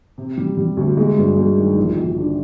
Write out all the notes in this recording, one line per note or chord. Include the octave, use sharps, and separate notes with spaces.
C3
G3
G3
D2
G#3
G2
G#3
D#3
A#1
A#1
D4